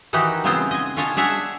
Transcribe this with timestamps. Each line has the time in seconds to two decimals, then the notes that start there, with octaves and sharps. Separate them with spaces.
0.13 D#3 E3 D#4 F#4 G4 G5
0.44 C#3 G#3 B3 C4 F4 C5
0.71 D#5 G#5
0.97 C#4 F4 C#5 D#5 F5 A5
1.16 D4 G#4 C#5 E5 F#5